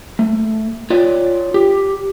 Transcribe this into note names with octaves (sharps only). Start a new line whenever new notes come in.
A3
F4 C#5 D5
G4